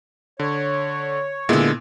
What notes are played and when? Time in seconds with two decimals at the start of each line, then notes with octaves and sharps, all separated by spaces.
0.39 D3 C#5
1.49 A#2 D3 G#3 B3 E4